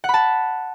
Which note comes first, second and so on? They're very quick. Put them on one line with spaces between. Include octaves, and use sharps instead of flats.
F#5 B5 A5